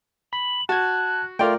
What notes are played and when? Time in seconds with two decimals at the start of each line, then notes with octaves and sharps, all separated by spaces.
0.33 B5 F#7
0.69 F#4 A5 F#6 G#6
1.39 A3 F4 A#4 D5 G5